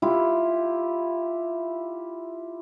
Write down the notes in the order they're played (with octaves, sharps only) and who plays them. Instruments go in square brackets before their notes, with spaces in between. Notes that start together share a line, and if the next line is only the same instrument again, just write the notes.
[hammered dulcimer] E4 F4 G4